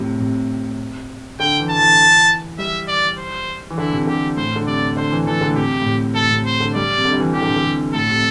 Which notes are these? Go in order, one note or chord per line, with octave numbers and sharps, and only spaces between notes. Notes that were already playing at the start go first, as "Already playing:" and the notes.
Already playing: A2 C3
C3
D3 G5
E3
A5
E3
G3 E5
D5
C5
E3
D3 E4
C3
D3 G4
A2 C5
D3
C3 D5
D3 C5
E3
E3 A4
D3
A2
C3 G4
A2
C3
A2 A4
C3
C5
D3
G3 D5
C3
D3
G3
E3
E3 G4
D3
C3
D3
C3
A2 A4
C3